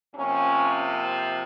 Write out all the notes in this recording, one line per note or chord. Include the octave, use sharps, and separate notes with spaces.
C3 F3 A#3 C#4